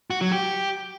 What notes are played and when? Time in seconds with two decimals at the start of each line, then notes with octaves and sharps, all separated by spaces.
0.10 F#4
0.21 F#3
0.32 G4